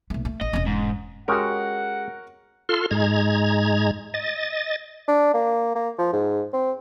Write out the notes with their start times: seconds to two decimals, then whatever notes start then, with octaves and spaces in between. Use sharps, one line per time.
0.10 B1 A3
0.25 A3
0.41 A1 D#5
0.53 E1 C#4
0.66 G#2
1.28 G#3 C#4 F#4 G4 A#4 F#5
2.69 F4 A4 C6 F6
2.91 G#2 G#3 A#5 G#6
4.14 D#5 A6
5.08 D4
5.34 A#3
5.75 A#3
5.98 F3
6.13 G#2
6.53 C4